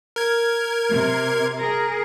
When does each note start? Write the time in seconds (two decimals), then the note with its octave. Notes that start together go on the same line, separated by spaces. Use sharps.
0.16 A#4 G#6
0.89 C3
1.57 G#4 A#4